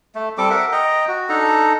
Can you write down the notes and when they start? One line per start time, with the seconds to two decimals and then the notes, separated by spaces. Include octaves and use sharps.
0.15 A3
0.38 G3 C4 A4 D6
0.50 A#4 E5 F#5
0.72 D#5 G5 A#5
1.08 F#4
1.29 D4 D#4 A4 A#5